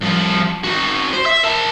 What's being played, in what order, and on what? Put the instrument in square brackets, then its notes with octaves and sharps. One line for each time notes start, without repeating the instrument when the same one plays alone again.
[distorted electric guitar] C2 F3
D#3 F#4
C5
E5
A#4 A5